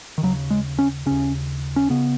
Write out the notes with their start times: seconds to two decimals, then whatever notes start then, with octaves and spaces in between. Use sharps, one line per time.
0.18 D#3
0.23 D#2 C#3 F#3
0.50 G#3
0.79 C#4
1.06 D#2 C#3 C#4
1.76 C#4
1.90 C#3 B3